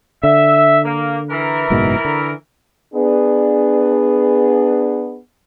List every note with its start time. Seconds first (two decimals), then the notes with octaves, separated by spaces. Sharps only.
0.23 D3 E5
0.85 A#3
1.30 E3 A#4
1.70 F#1 G#2 B2
2.05 D3
2.94 B3 D4 G#4